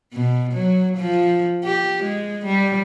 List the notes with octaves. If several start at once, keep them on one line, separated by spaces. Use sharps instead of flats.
B2
F#3
F3
G4
G#3
G3